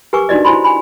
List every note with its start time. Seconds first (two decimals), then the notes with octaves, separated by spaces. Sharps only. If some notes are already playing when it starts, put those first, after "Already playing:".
0.13 G4 A#4 B4 G#5 C#6 D6
0.29 D4 D#4 F#4 D5 D#5
0.45 E4 F#4 C5 G#5 B5 C6
0.64 G#5 B5